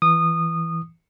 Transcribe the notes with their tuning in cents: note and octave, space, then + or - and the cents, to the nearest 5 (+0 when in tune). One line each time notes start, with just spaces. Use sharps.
E3 +0 D#6 -20